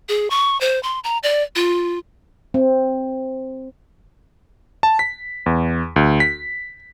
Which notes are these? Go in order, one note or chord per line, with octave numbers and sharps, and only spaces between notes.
G#4
C#6
C5
C6
A#5
D5
F4
C4
A5
B6
E2
D2
B6